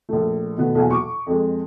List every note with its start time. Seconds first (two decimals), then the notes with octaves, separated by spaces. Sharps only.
0.09 A#1 A3
0.57 B2 D#3 A3 B3
0.75 B1 E2 A#2 F#4 G#5
0.91 C#6 D6
1.26 F2 G#3